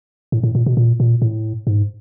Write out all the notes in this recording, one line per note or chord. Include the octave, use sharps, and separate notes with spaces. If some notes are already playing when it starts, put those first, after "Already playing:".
A2
A2
A#2
B2
A#2
A#2
A2
G#2